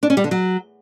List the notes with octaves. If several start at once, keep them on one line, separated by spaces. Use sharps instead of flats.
D4
C#4
G3
D3
F#3